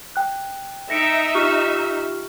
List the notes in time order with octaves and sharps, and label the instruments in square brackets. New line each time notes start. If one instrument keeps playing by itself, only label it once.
[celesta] G5 F#6
[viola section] D#4 E5 [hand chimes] A#6 C#7 D7
[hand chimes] F4 G4 F6 [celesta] C#6